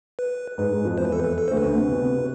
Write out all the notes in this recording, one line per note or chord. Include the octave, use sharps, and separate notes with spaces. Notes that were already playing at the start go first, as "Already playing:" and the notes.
B4
G#2 G#3 B4
G#2 G#3
F2 F3
E2 E3 C5
B4
A4
B4
A4
D2 D3 C5
B4
D2 D3
C3
B2
C3
C3